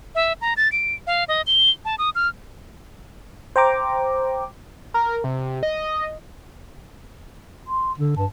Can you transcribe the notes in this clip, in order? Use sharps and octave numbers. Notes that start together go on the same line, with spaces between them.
E5
A#5
A6
D7
F5
D#5
G7
A5
D#6
F6
C5 G5 A#5 D6
A#4
C3
D#5
C6
D3 D4
G2 A5